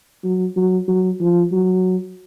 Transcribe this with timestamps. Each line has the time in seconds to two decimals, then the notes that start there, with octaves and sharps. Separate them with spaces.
0.24 F#3
0.56 F#3
0.88 F#3
1.20 F3
1.52 F#3